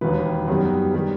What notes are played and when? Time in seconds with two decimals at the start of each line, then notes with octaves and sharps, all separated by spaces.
0.01 E1 D#2 D#3 B4
0.48 F#2 D#3 G3 B3
0.94 D#3 G3